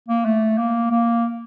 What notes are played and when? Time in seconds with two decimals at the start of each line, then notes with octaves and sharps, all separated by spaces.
0.09 A#3
0.25 A3
0.58 A#3
0.91 A#3